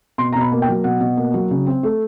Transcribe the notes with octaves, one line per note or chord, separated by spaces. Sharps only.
B2 C6
B2 A#5
B5
A#3
G5
F#3
B2 F#5
B2
A#3
F#3
C#3
C4
A3